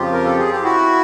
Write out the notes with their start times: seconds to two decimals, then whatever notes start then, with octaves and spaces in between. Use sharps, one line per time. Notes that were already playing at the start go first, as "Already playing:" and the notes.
Already playing: F2 C#3 F3 F4 G4
0.12 A#4
0.25 A4
0.38 G#4
0.51 G4
0.63 E4 F#4